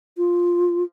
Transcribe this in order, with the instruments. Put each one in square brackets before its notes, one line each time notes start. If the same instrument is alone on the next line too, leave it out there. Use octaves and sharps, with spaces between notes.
[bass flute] F4